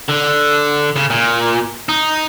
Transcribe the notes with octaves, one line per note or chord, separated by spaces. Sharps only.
D3
C#3
A#2
D#4